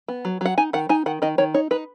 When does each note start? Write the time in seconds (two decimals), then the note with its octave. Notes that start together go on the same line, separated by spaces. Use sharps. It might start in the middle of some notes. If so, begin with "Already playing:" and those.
0.08 B3
0.25 F#3
0.41 F#3 F#5
0.58 D#4 G#5
0.73 D#3 F#5
0.89 D#4 G#5
1.06 D#3 F#5
1.22 D#3 D#5
1.38 D#3 C#5
1.54 D#4 C#5
1.71 D#4 B4